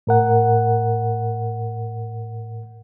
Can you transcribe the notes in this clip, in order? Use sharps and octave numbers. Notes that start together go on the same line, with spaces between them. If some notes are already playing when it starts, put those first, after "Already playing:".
A2 A#4 F#5